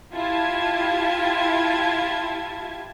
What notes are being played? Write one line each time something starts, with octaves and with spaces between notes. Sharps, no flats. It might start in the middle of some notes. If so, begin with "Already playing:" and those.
E4 F4 G4 A5 G#6